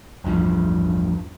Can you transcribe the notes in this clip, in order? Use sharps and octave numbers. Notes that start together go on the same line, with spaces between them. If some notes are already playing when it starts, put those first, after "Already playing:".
A1 E2 G2 F3